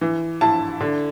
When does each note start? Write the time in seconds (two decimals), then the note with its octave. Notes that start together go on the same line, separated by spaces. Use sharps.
0.01 E3
0.41 E4 A5
0.81 D3